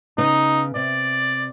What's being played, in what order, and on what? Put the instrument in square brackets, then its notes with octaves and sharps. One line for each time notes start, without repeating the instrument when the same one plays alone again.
[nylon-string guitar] C#3 B3 [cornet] D#4
[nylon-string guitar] C3 [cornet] D5